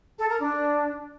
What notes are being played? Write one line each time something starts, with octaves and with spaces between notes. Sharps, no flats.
A4
A#4
D4